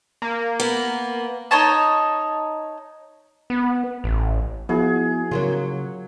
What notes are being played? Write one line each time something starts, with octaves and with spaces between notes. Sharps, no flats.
A#3
B3
D#4 C#5 A5
B3
A1
F3 B3 E4 F#4 G#4
C#3 F#3 A#3 F4